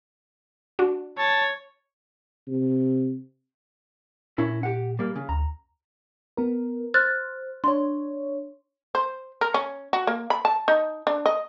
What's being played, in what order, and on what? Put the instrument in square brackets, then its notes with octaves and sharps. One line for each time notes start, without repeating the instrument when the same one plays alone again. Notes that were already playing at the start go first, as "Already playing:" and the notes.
[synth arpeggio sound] D4 F#4
[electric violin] C#5 [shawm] A5
[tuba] C3
[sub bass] A#2 [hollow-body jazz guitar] C#4 E4 A#4
[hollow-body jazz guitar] G4 F#5
G3 A#3
C#3
[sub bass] D2 [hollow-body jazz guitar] A#5
[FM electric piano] B3 A#4
[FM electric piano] C5 [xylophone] F6 F#6 A6
[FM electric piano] D4 C#5 [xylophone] C6
[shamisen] C5
A#4
C#4
F#4
A#3
B5
A5
D#4
D4
D#5